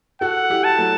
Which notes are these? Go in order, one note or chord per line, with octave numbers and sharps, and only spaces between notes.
F#4 A4 F#5
E4 G4
A5
F#3 A3